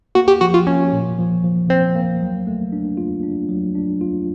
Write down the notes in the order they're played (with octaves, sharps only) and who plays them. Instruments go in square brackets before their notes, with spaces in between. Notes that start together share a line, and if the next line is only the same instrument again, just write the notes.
[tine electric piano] A#3 [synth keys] F#4
[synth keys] G4
[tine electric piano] F3 [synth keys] F#4
[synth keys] F4
[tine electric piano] A#3 [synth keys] C#4
[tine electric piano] A#2
F3
F3
[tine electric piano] F3 [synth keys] C4
[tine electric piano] A#3
F#3
A3
D4
F4
D4
F#3
D4
F4